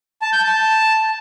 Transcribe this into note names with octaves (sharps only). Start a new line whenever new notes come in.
A5
G6
A5